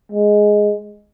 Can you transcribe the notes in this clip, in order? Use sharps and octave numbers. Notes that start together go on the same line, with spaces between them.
G#3